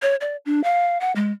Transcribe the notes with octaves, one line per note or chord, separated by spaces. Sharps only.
C#5
D5
D4
F5
F#5
G#3